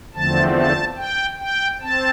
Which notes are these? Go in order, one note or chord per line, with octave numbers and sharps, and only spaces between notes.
E2 D3 F3 A3 C4 A5
A5
G5
G5
C4 A5